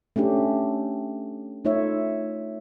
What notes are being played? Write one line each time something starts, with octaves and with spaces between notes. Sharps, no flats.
A3 C#4 D4 G4
A3 D#4 F4 C#5 E5